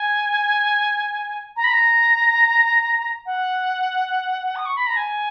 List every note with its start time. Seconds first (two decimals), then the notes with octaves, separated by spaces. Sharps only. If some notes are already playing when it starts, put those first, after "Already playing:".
Already playing: G#5
1.56 A#5
1.64 B5
1.70 A#5
3.26 F#5
4.56 D#6
4.66 C#6
4.76 B5
4.87 A#5
4.96 G#5